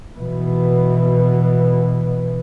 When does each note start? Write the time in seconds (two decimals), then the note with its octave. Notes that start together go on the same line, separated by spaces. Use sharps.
0.19 B2 E3